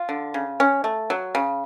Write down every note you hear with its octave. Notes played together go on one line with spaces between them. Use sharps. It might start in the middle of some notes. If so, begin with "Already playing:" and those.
Already playing: F4
D3
C#3
C#4
A3
F#3
C#3